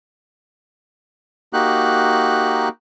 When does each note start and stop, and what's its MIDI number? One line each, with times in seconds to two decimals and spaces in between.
1.53 2.69 58
1.53 2.69 63
1.53 2.69 66
1.53 2.69 67
1.53 2.69 90